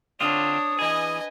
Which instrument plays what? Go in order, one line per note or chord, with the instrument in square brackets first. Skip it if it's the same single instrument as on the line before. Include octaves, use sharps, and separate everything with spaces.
[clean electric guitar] D3 C4 F4 [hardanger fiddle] D4 C#5 [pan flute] D#6
[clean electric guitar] E3 G#4 [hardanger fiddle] B4 [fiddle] D#5 G#5